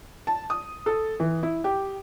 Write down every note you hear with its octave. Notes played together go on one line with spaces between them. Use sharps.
A5
D#6
A4
E3
E4
G4